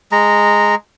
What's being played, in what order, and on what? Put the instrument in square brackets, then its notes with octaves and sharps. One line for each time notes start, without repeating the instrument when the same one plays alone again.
[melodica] G#3 A#5